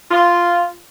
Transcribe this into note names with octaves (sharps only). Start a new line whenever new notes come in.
F4